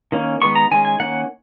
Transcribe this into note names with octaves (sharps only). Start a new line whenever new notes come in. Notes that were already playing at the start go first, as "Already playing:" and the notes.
D#3 A#3 C#4
D#3 G#3 B3 C#6
A#5
D#3 G#3 C#4 G#5
G#5
D#3 A#3 C#4 F#5